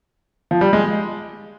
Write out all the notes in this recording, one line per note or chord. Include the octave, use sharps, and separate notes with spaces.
F3
G3
G#3